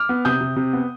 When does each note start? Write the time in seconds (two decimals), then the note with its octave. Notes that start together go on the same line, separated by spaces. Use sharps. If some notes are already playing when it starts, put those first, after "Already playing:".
Already playing: D6 F6
0.09 B3
0.25 C3 D#6 G6
0.41 C3
0.56 C3
0.73 B3